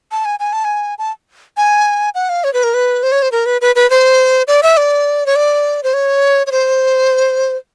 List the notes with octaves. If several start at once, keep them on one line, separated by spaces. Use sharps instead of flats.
A5
G#5
G#5
A5
G#5
A5
G#5
F#5
F5
C#5
B4
A#4
B4
C5
C#5
C5
A#4
B4
B4
B4
C5
D5
E5
D5
C#5
D5
C5
C#5
C#5
C5